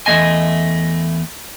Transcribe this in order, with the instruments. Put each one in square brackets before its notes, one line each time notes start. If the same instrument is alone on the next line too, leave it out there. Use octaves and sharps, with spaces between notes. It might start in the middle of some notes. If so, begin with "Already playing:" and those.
[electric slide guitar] E2 A3 A#3 D#5 G#5